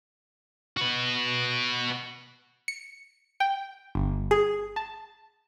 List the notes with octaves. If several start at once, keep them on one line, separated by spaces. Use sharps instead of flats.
F#4 B4
C#7
G5
G1
G#4
A5